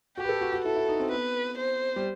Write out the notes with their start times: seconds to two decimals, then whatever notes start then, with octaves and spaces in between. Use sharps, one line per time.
0.17 F#4 G4
0.24 B4
0.29 A4
0.41 F#4
0.53 F#4
0.65 E4 A4
0.76 E4
0.89 D#4
1.00 C4
1.11 B3 B4
1.58 C5
1.96 G3